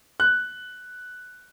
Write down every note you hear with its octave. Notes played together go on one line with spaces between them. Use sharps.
F#6